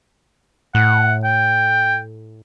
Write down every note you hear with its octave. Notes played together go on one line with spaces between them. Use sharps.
A2 F#5
G5